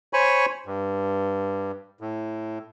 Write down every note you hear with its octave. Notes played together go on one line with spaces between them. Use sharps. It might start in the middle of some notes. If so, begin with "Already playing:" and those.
C5 C#5 G#5 B5 C#6
G2
A2